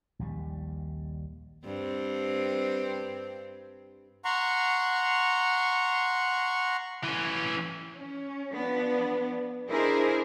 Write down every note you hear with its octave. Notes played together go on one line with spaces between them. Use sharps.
A#1 D#2 G3
G2 C4
F#5 A#5 C6 C#6
E3 C#4
C#4
F3 B3 D4
D4 E4 G#4 A#4 C5 D#5